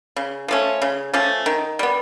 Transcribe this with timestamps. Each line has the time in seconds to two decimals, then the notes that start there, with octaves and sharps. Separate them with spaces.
0.16 C#3
0.48 F3 A3 C#4
0.82 C#3
1.13 F3 A3 C#4
1.46 D#3
1.79 G3 B3